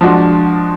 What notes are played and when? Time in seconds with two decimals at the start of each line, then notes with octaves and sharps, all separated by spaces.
0.01 F3 G#3 D4 F#4